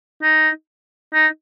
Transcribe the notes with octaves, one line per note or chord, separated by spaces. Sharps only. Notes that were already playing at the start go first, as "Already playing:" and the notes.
D#4
D#4